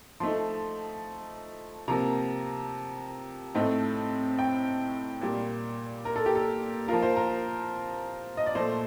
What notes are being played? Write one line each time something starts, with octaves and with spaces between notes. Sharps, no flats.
F3 A3 D#4 C6
C3 F3 A#3 A#5
A2 A3 C4 D#4
G5
A#2 G3 A#3
A#4
A4
G4
A4
F3 A#3 F4 A#4
C5
A#4
D#5
D5
A#2 F3 A3 C5